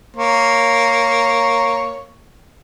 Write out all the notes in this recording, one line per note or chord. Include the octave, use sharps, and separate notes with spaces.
A#3 C#5